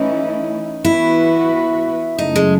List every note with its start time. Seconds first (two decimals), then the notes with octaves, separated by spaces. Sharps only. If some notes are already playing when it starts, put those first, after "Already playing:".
Already playing: E3 A3 C#4 D#4 E4
0.84 E3 B3 E4 F#4 B4
2.18 F#2 C#3 F#3 A3 D#4
2.36 G#3